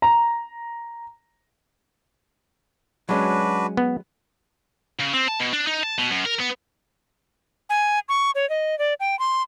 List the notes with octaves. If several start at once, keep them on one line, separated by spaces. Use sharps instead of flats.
A#5
F#3 G#3 C#4 D4 F#4 B4
B3
C#3
C4
A5
B2
D4
D#4
A5
B2
F#2
A#4
B3
G#5
C#6
C#5
D#5
D5
G5
C6